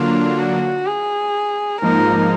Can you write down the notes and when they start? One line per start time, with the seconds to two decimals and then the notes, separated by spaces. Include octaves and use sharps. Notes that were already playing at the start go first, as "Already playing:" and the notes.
Already playing: D3 F#3 A#3 D4 F4
0.39 F#4
0.86 G#4
1.81 G#2 F3 A#3 D#4 A#4